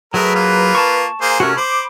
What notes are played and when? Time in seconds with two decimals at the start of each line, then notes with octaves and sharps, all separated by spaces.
0.14 F#3 A3 G#4 A#4 B4
0.35 A#3 F4
0.75 A5 C#6
1.21 A#3 G#4 C5
1.40 C3 A3 C#4 F#4 A#4
1.57 C5 B5 D6